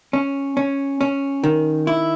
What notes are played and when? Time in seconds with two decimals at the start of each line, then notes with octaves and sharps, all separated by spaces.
0.13 C#4
0.57 C#4
1.01 C#4
1.44 D#3
1.87 E4